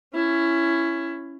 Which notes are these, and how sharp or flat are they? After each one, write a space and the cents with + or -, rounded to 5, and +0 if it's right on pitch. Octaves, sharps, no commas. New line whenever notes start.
C#4 +0 E4 +15